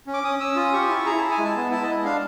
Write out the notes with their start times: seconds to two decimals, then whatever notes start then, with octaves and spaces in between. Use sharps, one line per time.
0.07 C#4
0.14 D6
0.23 C#4 D#6
0.39 C#4 E6
0.56 F4 D#6
0.72 G4 C#6
0.89 E4
1.06 G#4 A#5
1.18 E4 A5
1.31 G#5
1.39 G#3
1.44 A5
1.55 B3
1.71 E4 A5
1.83 G#3 D#5
2.04 D4 F5